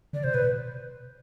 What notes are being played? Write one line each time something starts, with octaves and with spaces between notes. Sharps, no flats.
D3 D5
C3 C5
B2 B4
B2